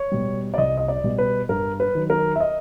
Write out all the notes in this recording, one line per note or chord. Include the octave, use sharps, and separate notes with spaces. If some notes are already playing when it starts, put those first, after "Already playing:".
Already playing: C#5
B2 G3
D5
C2 D#5
D#5
D5
B2 G3
B4
G2 A#4
B4
D#3 F#3
A#4
E5
D#5